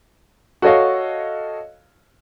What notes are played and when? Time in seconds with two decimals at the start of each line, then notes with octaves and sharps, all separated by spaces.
0.62 F#4 A4 C#5 D#5 F5